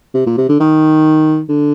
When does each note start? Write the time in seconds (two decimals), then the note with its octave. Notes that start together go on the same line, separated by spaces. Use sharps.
0.14 C3
0.26 A#2
0.37 C3
0.49 D3
0.60 D#3
1.49 D3